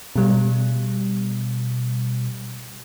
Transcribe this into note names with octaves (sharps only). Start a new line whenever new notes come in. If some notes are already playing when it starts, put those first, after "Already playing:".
B2 G3